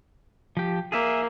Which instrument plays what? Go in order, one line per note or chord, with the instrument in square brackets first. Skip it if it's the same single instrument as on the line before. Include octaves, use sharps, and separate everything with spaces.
[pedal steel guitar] F3 G4
[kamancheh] A#3 [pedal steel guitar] G#4 E5